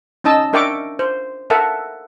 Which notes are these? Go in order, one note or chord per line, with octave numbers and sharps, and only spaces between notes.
C#4 D#4 D#5 A5 E6
D4 A#4 E5 G5 C#6 D6
C5
A4 A#4 E5 F#5 A5